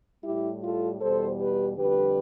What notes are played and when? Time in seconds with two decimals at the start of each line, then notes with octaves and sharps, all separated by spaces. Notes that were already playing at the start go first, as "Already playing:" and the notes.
0.24 A2 G3 E4 G4
0.62 F4 A4
1.01 E2 B2 G3 A4 C5
1.39 G4 B4
1.77 F2 D3 G3 G4 B4